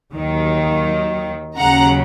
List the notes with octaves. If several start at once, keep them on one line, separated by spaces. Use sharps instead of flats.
D#2 D#3 F#3
D#2 C#3 F#3 F#5 A#5